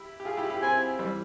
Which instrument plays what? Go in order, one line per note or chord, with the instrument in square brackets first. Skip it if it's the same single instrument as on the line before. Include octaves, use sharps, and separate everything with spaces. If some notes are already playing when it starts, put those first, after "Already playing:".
Already playing: [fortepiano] E4 G4
G4
F4 G#4
E4 G4
E4 G4
[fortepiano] C4 E4 [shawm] G#5
[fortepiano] E3 G3